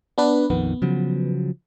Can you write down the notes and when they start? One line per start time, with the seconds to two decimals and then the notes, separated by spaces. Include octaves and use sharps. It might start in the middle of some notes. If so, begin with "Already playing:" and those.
0.18 B3 D4 B4
0.50 A#1 F2 D#3 B3
0.82 C#3 F3 F#3